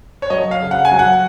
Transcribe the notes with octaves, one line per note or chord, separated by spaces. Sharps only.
C#5
F#3 D#5
F5
C#3
F#5
G#5
F#3
F#5